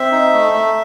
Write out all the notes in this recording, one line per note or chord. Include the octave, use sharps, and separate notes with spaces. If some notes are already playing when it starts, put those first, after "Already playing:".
Already playing: C4 E5
D#4
A3
A3